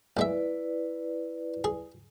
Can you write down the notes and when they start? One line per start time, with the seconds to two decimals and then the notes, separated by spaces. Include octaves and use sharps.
0.17 A#1 G#3 E4 B4 D5 E5
1.64 G#4